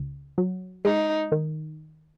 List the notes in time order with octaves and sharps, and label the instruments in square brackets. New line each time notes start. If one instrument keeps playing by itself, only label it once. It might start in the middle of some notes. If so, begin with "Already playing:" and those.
Already playing: [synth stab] C#2
F#3
[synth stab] G#3 [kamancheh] D#4
[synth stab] D#3